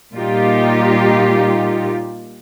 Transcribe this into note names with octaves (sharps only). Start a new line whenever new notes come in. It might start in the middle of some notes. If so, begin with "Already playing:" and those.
A#2 G3 D#4 F4 G4